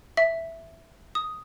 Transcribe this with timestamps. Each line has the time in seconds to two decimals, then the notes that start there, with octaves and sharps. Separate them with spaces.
0.17 E5
1.15 D#6